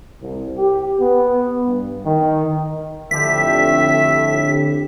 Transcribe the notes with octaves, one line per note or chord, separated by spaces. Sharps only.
C2
G4
B3
G2
D#3
F2 A2 D3 G4 E5 B6